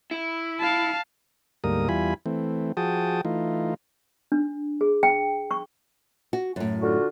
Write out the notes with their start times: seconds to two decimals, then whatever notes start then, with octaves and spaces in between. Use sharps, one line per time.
0.11 E4
0.59 F5 A5
1.64 D2 G#2 G3 A#3 A#4 D#6
1.89 E2 G3 E4 F4 G#5 B5
2.26 E3 A3 C4
2.77 F3 F#4 G#4 G5 A5 D#6
3.25 E3 A3 D#4 F4
4.32 D4
4.81 G#4
5.03 G5
5.51 C#6
6.33 F#4
6.56 F#2 A2
6.81 D3 F4 F#4